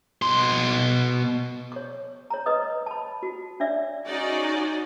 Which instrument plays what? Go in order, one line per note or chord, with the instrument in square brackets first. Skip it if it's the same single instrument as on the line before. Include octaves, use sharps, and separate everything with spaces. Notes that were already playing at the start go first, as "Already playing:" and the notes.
[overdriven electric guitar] B2 C6
[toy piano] C#5 C#6
C#5 A#5
B4 D#5 D#6
A5 B5
F#4
D4 C#5 D5 E5
[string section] C#4 D#4 F#4 G#4 D5 D#5